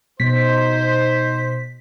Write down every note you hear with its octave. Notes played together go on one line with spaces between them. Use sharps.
B2 D#4 C5 B6